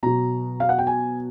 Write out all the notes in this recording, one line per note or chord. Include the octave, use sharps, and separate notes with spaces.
B2 F#3 A#5
F5
F#5
G5
G#5